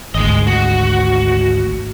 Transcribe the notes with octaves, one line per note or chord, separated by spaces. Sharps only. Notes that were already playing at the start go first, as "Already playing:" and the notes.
G#1 D2 G#3 D#5
F#4